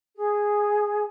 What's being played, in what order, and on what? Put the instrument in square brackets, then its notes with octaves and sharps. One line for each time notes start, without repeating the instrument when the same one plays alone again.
[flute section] G#4